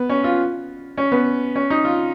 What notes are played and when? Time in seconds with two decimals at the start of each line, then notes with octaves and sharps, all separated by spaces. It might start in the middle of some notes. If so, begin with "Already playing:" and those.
Already playing: B3
0.09 C#4
0.24 F4
0.97 C#4
1.12 B3
1.55 C#4
1.70 D#4
1.85 F4